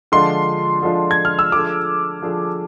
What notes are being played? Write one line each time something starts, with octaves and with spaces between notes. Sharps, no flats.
D3 F3 G#3 D4 F4 C6
D3 F3 G#3 D4 F4
G#6
F6
E6
F3 A3 D4 G#4 D6
F3 A3 D4 G#4